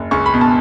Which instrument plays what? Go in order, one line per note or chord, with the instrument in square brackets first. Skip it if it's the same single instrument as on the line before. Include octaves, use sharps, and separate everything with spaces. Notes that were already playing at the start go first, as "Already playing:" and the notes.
Already playing: [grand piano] F#1
C#2 C#6
B5
B2
A5